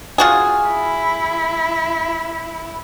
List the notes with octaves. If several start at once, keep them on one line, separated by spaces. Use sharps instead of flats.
F4 F#4 G#4
E4